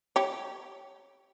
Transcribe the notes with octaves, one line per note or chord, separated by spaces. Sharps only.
G4 C#5